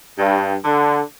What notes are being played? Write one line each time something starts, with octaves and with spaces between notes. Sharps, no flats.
G2
D3